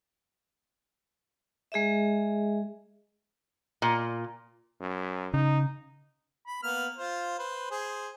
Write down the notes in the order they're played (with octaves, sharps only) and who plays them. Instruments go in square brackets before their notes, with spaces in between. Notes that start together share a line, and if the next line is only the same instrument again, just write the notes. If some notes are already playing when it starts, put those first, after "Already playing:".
[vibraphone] G#3 G#4 D#5 E5
[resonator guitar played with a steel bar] A#2
[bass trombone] F#2
[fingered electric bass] C#3 [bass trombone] D#4
[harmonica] B5
A#3 B3 F6
F4 C5
B4 C5
G#4 C5